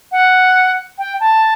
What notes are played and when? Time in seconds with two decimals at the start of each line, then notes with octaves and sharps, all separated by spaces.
0.12 F#5
0.98 G5
1.20 A5